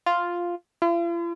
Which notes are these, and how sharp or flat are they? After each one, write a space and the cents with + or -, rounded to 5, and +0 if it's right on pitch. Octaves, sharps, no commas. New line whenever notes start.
F4 +0
F4 -45